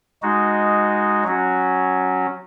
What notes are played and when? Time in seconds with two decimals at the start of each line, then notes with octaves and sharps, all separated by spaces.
0.23 G#3 D#4 F#4
1.24 F#3 C#4 F#4